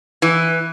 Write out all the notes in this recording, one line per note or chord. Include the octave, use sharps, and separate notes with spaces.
E3